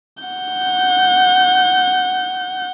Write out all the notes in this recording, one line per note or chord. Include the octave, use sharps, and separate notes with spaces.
F#5 G6